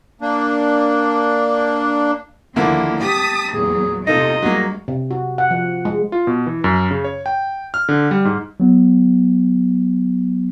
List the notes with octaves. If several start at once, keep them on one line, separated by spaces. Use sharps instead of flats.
A#3 D4
D#2 D3 F3 A#3 E4
G4 A5 D#6 B6
E2 A#2 F#3 G#4
C3 D#4 F4 A4 D#5
G2 F#3 G#3 A#3
C3
F#4
F#5
F3
G#3
F4
B2
E3
F#2
C#3
C#5
G5
F6
D3
G3
G#2
F#3 B3